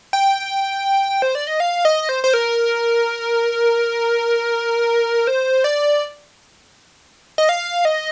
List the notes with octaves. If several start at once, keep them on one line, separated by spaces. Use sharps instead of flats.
G5
C5
D5
D#5
F5
D#5
C5
C5
A#4
C5
D5
D#5
F5
D#5